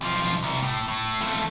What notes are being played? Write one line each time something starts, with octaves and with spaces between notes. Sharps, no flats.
B1 F3
C2
A2
A2
F3 A3